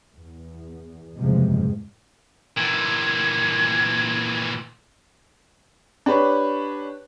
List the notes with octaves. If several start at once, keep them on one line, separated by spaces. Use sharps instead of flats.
E2
F#1 E2 A2 C3 F3 G#3
A#2 E3 G#6
D4 G4 B4 C#5